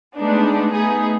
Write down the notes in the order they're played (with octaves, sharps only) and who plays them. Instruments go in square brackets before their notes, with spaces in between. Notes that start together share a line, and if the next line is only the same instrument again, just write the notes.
[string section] G#3 A3 B3 D4 D#4
A3 B3 D#4 G#4 D#6